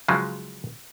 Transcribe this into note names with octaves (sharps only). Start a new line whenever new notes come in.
C#3 F3 F#3 G#3